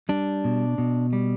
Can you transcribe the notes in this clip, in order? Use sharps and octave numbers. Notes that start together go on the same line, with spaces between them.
G3 D4
B2
B2
G3